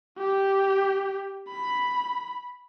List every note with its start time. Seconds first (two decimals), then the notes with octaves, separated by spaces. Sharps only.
0.18 G4
1.48 B5